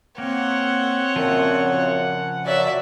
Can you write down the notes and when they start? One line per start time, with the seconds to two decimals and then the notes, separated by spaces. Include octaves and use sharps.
0.18 A#3 C4 C#5 F#5
1.16 F#2 A#2 C#3 F3
2.45 F#2 A#2 F#3 D5 E5